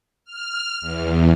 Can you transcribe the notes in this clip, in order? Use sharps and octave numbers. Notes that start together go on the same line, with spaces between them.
F6
E2